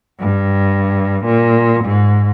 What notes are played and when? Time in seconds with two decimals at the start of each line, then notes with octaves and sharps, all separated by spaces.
0.20 G2
1.25 A#2
1.85 G#2